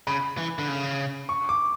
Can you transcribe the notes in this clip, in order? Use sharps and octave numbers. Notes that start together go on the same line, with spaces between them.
C#3 B5
E3
D3
C#3
C#6
D6